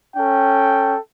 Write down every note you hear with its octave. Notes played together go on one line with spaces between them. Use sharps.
C#4 A4 G5